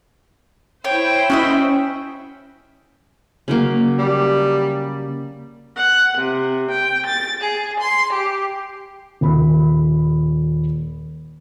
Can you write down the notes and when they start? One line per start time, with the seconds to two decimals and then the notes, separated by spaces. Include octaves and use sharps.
0.85 E4 C5 C#5 G5
1.30 C#4 F#4 D#5 E5
3.48 C#3 F#3 A#3
3.98 G3
5.76 F#5
6.19 C3
6.70 G5
7.07 A6
7.40 G#4
7.79 C6
8.13 G4
9.21 D#1 B5